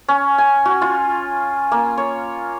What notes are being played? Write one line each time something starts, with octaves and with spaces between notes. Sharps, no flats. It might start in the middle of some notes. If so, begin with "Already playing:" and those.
C#4
G#5
F#4
F4
A#3
C#5